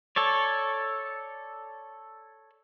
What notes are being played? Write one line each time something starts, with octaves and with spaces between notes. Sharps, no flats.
A4 C#5 D5